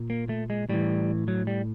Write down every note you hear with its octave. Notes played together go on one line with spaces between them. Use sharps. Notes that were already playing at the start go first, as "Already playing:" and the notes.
Already playing: A#2
A#3
A3
G#3
A2 E3 G3
F#3
G3